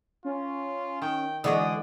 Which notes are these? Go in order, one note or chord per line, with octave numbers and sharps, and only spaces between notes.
C#4 F4
D#3 G5
D3 E3 G#3 B3 D4 F#4 D5 D#6